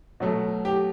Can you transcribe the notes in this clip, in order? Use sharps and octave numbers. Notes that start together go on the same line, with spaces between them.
B2 F#3 A3
G4